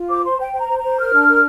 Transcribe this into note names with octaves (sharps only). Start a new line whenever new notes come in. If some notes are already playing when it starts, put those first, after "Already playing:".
Already playing: F4
C5 D6
C5 C6
C5 G5
C5 A#5
C5
A#5
C5
A#4 F6
D4
A#4